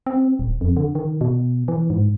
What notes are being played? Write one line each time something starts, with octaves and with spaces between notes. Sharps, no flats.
C4
D#1
F2
D3
D#3
B2
E3
G#2